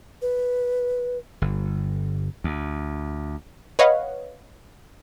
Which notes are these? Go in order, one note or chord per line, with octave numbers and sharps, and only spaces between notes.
B4
G1
D2
B4 C#5 D#5 F5 F#5